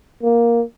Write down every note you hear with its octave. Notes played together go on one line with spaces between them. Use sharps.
A#3